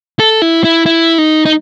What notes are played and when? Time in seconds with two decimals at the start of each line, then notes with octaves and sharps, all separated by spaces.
0.20 A4
0.42 E4
0.64 E4
0.86 E4
1.18 D#4
1.46 D#4